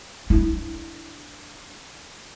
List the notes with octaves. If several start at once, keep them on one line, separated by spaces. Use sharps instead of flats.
D4 E4